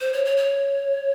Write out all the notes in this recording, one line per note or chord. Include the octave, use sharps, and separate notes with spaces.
C5
C#5
C#5
C#5